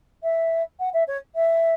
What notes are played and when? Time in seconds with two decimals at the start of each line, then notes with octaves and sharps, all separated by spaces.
0.23 E5
0.79 F#5
0.93 E5
1.07 C#5
1.35 E5